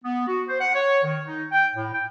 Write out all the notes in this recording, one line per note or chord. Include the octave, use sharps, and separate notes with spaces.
B3
F#4
C5
F#5
C#5
D#3
D#4
G5
A2
G5